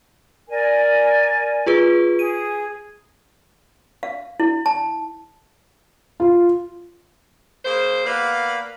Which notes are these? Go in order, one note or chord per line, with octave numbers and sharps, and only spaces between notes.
A#4 D5 G#5
F4 G#4 B4
G#4 D#7
F5
E4
A5
F4
C#3 A#3 C5
A#3 B3 B4 D5 F5